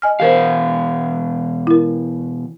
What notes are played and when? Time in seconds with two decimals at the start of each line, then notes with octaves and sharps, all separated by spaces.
0.02 D#5 G#5 F6
0.20 B2 E3 G4 A#4 C5 F5
1.67 E4 A#4